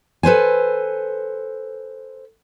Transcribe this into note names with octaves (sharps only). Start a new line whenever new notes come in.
A4 B4 C5 G#5